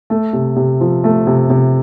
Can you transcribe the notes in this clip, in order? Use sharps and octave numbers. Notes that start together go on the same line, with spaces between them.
A3
C3
C3
F3
A3
C3
C3